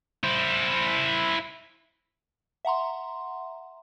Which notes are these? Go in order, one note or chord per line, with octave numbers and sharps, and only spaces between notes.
E4 C5
E5 F#5 A#5 C6